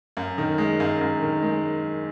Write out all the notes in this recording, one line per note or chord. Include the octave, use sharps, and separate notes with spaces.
F#2
D#3
G#3
F#2
F#2
D#3
G#3